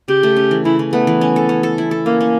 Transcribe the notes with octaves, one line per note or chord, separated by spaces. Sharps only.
C#3 G4
A3
C#4
E3
C#3 E4
E3
A3 B3
E3
C#4
A4
C#4
A4
E4
A4
A#3 C#4
C#4